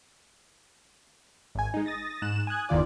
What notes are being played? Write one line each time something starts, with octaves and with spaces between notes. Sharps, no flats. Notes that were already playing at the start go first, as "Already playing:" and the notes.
G#1 G#5
G#3 D#4
D#6 A6 A#6
G#2 F#6 E7
G#5 D#6 F#6 G#6
G1 E2 D#3 F4 D5